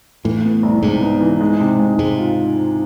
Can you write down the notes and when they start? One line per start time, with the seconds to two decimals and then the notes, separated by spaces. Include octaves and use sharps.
0.24 A2 E3
0.44 B3
0.63 C2
0.83 G#2 C3
1.02 B3
1.21 E3
1.41 G#3
1.60 C3
1.79 G#3
1.99 G#2 C3
2.18 F4